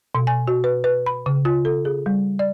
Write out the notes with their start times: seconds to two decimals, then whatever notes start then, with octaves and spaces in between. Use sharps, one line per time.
0.15 B2
0.27 G#5
0.48 F#4
0.64 B4
0.84 B4
1.06 B5
1.26 C#3
1.45 F4
1.65 A4
1.85 G#4
2.06 G3
2.39 D5